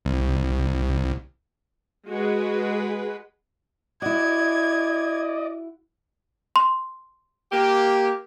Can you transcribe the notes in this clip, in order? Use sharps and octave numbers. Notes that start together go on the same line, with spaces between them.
C2
G#3 F#4 G#4 B4
E4 F#4 D5 D#5 G#6
C6
A#3 G4